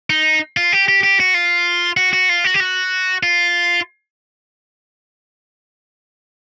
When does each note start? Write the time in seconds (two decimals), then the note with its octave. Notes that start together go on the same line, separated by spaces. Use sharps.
0.10 D#4
0.57 F4
0.73 G4
0.88 G4
1.03 G4
1.20 F#4
1.34 F4
1.97 F#4
2.13 F#4
2.29 F4
2.44 F#4
2.54 G4
2.60 F#4
3.23 F4